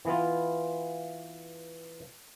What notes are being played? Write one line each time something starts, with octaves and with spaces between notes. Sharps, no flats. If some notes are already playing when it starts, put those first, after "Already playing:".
E3 B3 F4